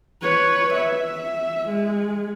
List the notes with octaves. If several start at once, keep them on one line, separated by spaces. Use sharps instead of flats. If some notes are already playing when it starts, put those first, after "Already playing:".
B4 C#5
E5
G#3